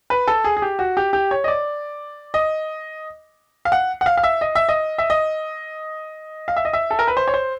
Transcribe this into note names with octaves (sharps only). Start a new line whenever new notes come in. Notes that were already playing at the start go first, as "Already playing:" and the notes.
B4
A4
G#4
G#4
G4
F#4
G4
G4
C#5
D#5
D5
D#5
F5
F#5
F#5
F5
F5
E5
D#5
E5
D#5
E5
D#5
F5
E5
D#5
E5
A4
A#4
B4
C5
C#5
C5